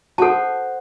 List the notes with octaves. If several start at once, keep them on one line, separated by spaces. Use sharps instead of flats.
F#4 A4 C5 A5